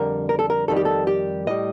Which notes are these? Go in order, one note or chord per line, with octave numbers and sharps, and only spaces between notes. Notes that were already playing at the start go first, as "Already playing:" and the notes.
Already playing: F2 D3 G3 A#4
A#4
A4
A#4
F2 D#3 G3 A4
G4
A4
G4
A2 G3 D#5